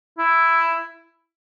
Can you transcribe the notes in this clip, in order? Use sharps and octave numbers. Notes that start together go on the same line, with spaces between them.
E4